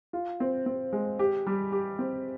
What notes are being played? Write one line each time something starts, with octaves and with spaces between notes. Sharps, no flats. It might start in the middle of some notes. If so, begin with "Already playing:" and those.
F4
C4
C4
G#3
G4
G3
G4
C4